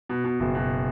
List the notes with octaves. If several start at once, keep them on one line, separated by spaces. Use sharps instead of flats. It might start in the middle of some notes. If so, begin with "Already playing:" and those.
B2
B2
F#1
B2